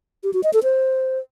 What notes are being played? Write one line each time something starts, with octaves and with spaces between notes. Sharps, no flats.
G4
F#4
D#5
A4
C5